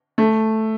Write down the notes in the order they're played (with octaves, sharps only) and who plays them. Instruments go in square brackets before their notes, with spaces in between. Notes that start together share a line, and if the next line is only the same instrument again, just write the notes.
[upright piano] A3